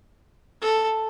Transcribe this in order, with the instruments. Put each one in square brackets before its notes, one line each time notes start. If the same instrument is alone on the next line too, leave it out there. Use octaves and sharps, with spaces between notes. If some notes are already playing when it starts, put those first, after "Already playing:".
[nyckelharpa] A4